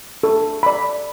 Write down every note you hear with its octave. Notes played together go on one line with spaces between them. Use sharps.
A4
D5 B5